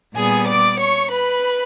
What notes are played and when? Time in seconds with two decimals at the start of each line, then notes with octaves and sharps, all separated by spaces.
0.15 A#2 G3 B3 G#4 G#5
0.48 D5 D6
0.79 C#5 C#6
1.11 B4 B5